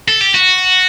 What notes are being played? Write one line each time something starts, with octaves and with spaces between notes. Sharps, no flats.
A4
G4
F#4